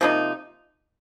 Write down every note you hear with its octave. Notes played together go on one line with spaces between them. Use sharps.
C3 F3 A#3 D#4